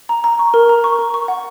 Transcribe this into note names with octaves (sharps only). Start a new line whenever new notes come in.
A#5
A#5
C#6
A#4
A#5
C#6
A#4
C#6
F#5